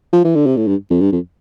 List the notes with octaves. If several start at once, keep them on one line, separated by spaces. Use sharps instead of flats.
F3
E3
D3
C3
A2
G2
F2
G2
F2